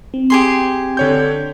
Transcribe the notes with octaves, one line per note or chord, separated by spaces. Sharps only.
C4
G4 G#4 C6
D3 C#5 G6